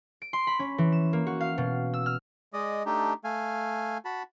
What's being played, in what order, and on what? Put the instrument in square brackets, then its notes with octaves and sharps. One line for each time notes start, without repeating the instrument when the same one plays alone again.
[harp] D7
C6
B5
C#4
E3
E7
A#3
F#4
F5
B2
E6
F6
[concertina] G#3 D5 D#5
A3 D4 D#4 G4
A3 F5 G#5
F#4 A5 B5